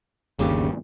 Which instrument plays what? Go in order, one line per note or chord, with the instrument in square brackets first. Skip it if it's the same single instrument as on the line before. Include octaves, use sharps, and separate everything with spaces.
[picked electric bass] G1 D#2 [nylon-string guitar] C#3 G4